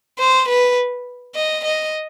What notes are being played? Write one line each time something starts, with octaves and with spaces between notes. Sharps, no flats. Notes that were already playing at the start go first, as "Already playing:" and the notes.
C5
B4
D#5
D#5